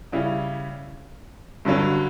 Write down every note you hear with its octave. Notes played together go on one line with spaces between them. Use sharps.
C#3 G3 C#4 E4
G2 D3 F#3 C#4